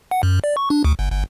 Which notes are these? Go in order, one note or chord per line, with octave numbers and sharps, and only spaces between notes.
F#5
F#2
D5
C#6
D4
D2
G1
G1